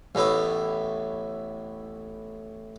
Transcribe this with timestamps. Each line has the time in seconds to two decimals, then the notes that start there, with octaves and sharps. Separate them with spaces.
0.15 A1 A2 B3 E4